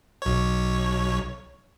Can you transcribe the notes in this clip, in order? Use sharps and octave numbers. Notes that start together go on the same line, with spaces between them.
B1 C#5